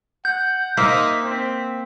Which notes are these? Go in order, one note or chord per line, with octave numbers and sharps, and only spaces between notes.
F#5 G6
A#3 D#4 C5 E5 B6
C4